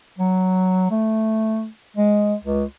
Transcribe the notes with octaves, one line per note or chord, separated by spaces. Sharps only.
F#3
A3
G#3
C#2